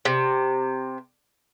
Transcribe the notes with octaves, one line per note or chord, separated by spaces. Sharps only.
C3